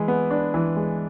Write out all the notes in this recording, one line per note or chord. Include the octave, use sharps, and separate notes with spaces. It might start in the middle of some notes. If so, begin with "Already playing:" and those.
Already playing: E3 G#3
B3
D4
E3
G#3